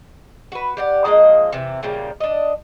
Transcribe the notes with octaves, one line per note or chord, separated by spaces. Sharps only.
F#4 B4
G4 D5 F#5
F3 G#3 A#3 D#5
C3 E3
A#2 C#3 F3 G3
D4 D#5